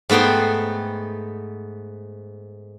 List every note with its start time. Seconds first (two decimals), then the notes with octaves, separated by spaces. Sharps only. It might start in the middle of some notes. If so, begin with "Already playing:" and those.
0.09 G#2 A3 B3 G5 C6